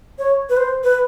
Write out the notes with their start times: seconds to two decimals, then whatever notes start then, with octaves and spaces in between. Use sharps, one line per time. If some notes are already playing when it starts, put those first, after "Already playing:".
0.19 C#5
0.49 B4
0.57 C5
0.84 B4